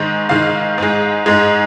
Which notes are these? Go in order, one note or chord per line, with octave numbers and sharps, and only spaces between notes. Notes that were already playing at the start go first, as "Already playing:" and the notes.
Already playing: G#2 D#3 G#3
G#2 D#3 G#3 F5
G#2 G#3
G#2 G#3